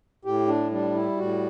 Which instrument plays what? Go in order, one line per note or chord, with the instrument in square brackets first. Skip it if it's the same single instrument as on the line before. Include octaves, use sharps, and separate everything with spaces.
[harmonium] A2 G4
D4
G3 D4
E4
A2 F#4